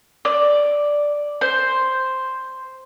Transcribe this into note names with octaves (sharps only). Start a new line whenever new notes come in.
D5
C5